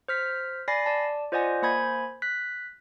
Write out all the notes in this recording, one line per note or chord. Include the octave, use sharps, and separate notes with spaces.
C5 F6 B6
D5 G#5 B5 A6 A#6 C7
D5 A5
F4 C5 D5 D#5 F#5 G#5
A#3 C5 G#5 B5 G#6
F#6 B6